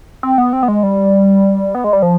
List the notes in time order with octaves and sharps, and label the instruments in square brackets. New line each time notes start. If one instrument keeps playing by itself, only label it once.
[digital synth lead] C4
B3
C4
B3
G#3
G3
B3
G#3
G3
F3